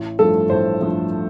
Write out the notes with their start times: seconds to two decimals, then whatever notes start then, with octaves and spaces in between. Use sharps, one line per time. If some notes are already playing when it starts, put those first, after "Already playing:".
Already playing: A1
0.19 G2 F3 A3 A4
0.50 A1 C5
0.81 G2 F3 A3